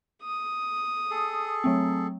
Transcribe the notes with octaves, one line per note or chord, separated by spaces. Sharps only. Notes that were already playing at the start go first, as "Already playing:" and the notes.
D#6
G#4 A4
F#3 A3 C4